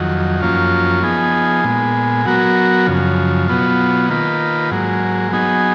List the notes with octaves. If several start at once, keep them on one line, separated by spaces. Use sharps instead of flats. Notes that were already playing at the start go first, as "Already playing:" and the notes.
Already playing: F2 D#3 F#3
F#2 F3 A#3 C#4 F4
F3 B3 D#4 G#4
A#2 G#3 B3
F#3 B3 F#4 A#4
F#2 C#3 F3
B2 F#3 B3 F4
D#3 A#3 F4 B4
G#2 F#3 A#3
F#3 B3 D#4 G#4